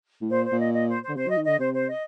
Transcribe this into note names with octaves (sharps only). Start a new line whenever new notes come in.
A2
A#2 C5
C5
A#2
D#5
D#5
C5
C5
D3
C3 C5
F#3
D#5
D#3
D3 D#5
C3 C5
C5
D#5